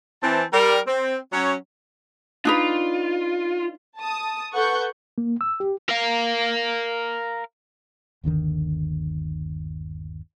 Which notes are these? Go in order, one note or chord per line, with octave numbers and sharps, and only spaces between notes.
E3 C4 A5
G3 A#4
C4
F#3 C#4 C#5
D4 D#4 F4 B4
A5 D#6
A4 B4 F#5 C#6 F#6 G6
A#3
E6
G4
A#4 F5
G1 D#2 D3 D#3